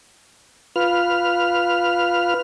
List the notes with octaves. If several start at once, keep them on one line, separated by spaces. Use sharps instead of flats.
F4 B4 F6